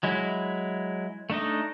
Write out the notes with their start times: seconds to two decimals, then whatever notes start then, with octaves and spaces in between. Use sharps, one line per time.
0.03 F#3 G#3 E4
1.30 A3 D4 D#4 D#5